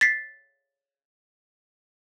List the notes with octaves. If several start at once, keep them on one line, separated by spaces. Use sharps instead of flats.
A6 B6 C7